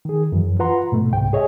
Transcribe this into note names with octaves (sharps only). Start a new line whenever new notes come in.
D#3 G#4
F#2 E3
F4 B4 F#5 A#5 C6
G#2 B2 A3
C2 G#2 C3 G5
G#4 C#5 D#5 E5 G#5